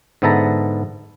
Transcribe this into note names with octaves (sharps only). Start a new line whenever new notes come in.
G#2 D3 B3 E5 A5 A#5